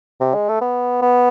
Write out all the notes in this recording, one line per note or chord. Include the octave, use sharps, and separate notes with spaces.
C3
G#3
A3
B3
B3